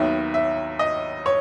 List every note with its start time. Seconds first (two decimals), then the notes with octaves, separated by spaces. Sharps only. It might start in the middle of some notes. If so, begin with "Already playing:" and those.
Already playing: D#2 D#3 F#3 B3 E5
0.34 E5
0.79 D#5
1.26 C#5